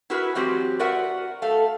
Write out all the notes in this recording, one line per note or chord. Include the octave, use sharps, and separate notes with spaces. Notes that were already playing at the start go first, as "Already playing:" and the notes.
E4 F#4 G#4 A#4 B4
E3 F#3 G#3 C4 F#4 G4
F#4 A#4 B4 D5 E5 F#5
A3 F5